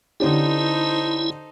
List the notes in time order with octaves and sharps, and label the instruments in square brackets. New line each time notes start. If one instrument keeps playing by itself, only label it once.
[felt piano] D3 C#4 G4 [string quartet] D#4 A4 C5 [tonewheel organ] E4